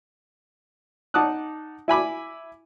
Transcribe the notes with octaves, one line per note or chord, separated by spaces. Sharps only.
D#4 F#5 A5 D6 D#6 F#6
E4 G#5 B5 D6